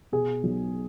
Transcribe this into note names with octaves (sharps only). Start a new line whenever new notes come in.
B2 G#4
B1